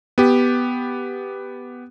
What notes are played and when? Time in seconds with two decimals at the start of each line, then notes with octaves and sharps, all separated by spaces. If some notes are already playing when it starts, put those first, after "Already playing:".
0.18 B3 G4